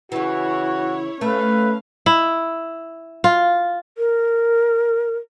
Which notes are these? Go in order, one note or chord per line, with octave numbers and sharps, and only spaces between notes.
C#3 E3 E4 F#4 C#5
A3 C#4 B4 F5
E4
F4
A#4